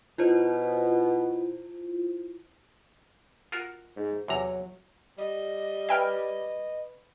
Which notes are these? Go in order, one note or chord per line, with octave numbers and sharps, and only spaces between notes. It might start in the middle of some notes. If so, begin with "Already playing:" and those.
B2 E4 F4 C5
F4 F#4 A#4
G#2
E2 C3 F#3 A#5
G3 D#5
B4 E5 G5 B5 F6 G#6